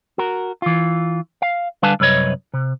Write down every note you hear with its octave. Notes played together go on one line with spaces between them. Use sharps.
F#4 A#4
E3 F4
F5
D3 G3 B4 F5 G#5 A5
C2 F#2 B4 C#5 D#5
C3